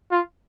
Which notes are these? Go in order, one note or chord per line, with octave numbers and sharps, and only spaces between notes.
F4